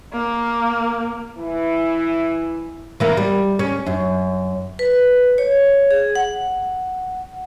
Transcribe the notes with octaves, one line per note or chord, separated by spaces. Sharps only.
A#3
E3 E4
E3 A#3 B3
G3
C#4
F#2
B4
C#5
G#4
F#5